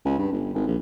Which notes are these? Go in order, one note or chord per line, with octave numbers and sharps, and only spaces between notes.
C#2
G2
G1
G#1
A#1